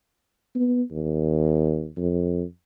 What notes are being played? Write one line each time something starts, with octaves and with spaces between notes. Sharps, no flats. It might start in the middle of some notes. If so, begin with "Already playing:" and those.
B3
D#2
F2